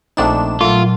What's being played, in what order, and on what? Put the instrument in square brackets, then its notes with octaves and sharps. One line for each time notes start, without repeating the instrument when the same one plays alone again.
[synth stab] A#1 D4 E7 [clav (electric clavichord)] A3 C4 D#4
[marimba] A#2 F#3 [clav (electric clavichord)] A3 A4 [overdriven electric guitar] F4